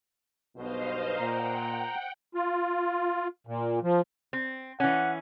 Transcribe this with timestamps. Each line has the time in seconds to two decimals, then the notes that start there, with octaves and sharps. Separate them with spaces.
0.55 B1 G2 B2 C5 D#5 F5
1.18 A#2 F#5 G5 A#5
2.35 F4
3.47 A#2
3.83 F3
4.33 C4
4.80 E3 C#4 F#5